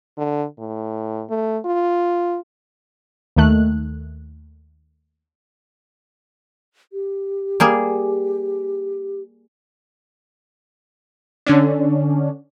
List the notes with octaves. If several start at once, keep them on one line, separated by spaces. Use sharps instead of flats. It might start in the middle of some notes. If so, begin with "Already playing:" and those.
D3
A2
A3
F4
D#2 D#3 A3 F#6
G4
G3 A#3 G#4
D3 C#4 D4